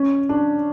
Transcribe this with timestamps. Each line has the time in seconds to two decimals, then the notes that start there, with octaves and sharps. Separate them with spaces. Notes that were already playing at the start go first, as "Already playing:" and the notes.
Already playing: C#4
0.29 D4